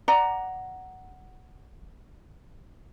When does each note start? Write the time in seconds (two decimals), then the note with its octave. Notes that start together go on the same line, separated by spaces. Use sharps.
0.08 D5 F#5 A#5